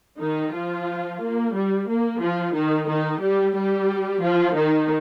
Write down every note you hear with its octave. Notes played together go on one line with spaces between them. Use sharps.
D#3 D#4
F3 F4
A#3
G3
A#3
F3 F4
D#3 D#4
D#3 D#4
G3 G4
G3 G4
F3 F4
D#3 D#4